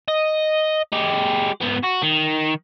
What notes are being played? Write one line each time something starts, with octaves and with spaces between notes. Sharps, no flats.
D#5
G#3 G4
G#2 B3
F#4
D#3